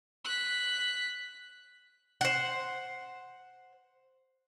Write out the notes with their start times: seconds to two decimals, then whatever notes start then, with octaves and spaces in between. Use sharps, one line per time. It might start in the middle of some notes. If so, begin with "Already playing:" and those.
0.25 F#6 B6
2.21 C5 F#5